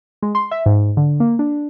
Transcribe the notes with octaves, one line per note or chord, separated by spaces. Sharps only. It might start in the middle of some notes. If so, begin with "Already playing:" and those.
G#3
C6
E5
G#2
D3
A#3
D4